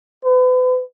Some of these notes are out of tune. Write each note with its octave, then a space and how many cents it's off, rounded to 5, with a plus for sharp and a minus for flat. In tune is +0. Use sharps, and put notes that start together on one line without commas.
B4 +40